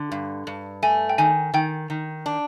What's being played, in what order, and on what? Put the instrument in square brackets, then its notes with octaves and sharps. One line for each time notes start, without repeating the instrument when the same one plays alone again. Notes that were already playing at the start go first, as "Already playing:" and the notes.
Already playing: [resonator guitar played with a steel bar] D3
G2
G2
[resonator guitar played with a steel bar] A3 [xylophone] G#5
[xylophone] G5
[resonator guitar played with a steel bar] D#3 [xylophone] G#5
[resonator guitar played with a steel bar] D#3 [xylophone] G5
[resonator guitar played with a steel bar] D#3
D4